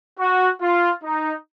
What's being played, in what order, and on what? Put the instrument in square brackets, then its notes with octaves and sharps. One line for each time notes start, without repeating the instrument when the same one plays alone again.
[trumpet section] F#4
F4
D#4